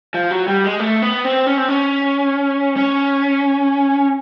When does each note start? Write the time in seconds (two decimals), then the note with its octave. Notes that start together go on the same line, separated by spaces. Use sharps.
0.14 F3
0.31 F#3
0.48 G3
0.64 G#3
0.80 A3
1.02 B3
1.25 C4
1.46 C#4
1.58 C4
1.69 C#4
2.76 C#4